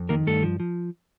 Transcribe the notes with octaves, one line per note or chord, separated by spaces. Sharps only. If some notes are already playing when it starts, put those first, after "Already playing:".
Already playing: F2
D#3 A#3 A#4
G2 A3 A4
F3
F3